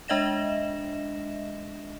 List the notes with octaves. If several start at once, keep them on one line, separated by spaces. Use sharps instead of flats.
G#3 D4 D#5 E5 A#6 E7